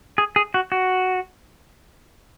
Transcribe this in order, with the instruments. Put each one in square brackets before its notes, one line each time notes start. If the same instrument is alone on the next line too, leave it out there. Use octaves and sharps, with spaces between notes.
[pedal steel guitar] G#4
G#4
F#4
F#4